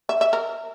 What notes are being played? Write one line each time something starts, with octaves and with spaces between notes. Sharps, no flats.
E5
E5
A#4